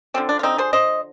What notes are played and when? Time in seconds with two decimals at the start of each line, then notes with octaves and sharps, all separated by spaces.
0.14 D3 F3 G#3 C4
0.29 D4
0.39 F4
0.43 C4 D#4
0.58 G#4 C5
0.73 C5 D#5